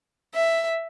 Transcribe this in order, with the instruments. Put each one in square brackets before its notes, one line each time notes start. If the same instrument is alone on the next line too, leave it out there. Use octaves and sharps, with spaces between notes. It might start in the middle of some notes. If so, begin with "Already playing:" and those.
[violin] E5